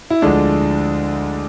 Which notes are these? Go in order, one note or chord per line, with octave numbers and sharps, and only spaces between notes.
E4
D2 D3 F3 G#3 D4